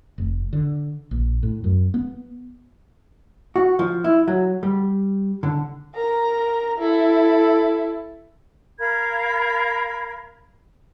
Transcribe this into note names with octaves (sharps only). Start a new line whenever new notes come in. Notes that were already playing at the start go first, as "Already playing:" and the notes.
F1
D3
A#1
A2
F#2
B3
F#4
F3
E4
F#3
G3
D3
A#4 A#5
E4 A4
A#4 F5 B5 G#6